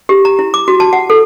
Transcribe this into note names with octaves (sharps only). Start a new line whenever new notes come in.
G4
A#5
E4
D6
F#4
A5
F#5
A4